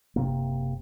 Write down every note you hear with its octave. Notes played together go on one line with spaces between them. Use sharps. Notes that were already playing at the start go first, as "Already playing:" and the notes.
F#1 C3 A#3